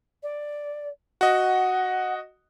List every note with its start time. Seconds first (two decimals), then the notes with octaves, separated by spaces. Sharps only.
0.23 D5
1.21 F#4 D#5 F#5